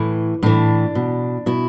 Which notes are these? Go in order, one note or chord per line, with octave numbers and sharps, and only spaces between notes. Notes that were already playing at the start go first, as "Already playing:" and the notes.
Already playing: A2 E3
A2 E3 D4
B2
B2 E4